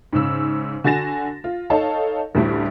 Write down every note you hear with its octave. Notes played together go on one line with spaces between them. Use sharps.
G#2 C#3 E6
D3 F#4 G#5 A6 A#6 E7
F4
D#4 A4 C#5 F5 A5
A1 D2 D3 G3 A3 E4